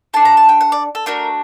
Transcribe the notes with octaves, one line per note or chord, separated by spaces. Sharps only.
D4 A4 A5
A#5
A5
G5
F#5
D5
A4
A3 D4 F#4 A#4